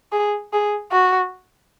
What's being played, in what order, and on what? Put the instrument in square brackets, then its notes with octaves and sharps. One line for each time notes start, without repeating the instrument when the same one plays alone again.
[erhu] G#4
G#4
F#4